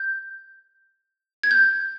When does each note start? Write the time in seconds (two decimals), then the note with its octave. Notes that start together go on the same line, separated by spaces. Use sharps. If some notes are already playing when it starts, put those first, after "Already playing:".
Already playing: G6
1.44 G#6
1.51 G6